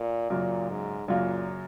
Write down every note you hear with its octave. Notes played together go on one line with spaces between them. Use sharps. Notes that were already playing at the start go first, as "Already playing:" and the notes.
Already playing: A#2
F#2 A#2 C#3 F#3 A#3 F4
G#2
F#2 A#2 C#3 F#3 A#3 F4